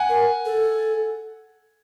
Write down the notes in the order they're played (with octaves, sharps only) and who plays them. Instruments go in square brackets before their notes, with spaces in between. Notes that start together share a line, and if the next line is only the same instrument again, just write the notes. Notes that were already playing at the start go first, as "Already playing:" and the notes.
Already playing: [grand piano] F#5 G#5
[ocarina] A#4
A4